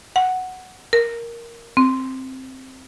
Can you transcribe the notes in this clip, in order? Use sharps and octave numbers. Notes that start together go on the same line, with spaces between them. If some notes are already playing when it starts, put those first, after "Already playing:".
F#5
A#4
C4